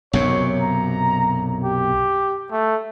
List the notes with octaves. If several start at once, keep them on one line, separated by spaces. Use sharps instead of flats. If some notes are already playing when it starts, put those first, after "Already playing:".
B1 F#2 C3 C#5
A#5
G4
A3